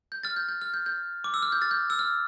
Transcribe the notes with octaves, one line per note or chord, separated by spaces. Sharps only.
G6
F6 A6
G6
G6
F6
G6
G6
D6
E6
F6
G6
F6 A6
G6
E6
F6